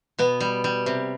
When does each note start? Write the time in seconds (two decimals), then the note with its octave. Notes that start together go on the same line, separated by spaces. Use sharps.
0.18 B2 B3
0.40 G3
0.64 G3
0.86 C3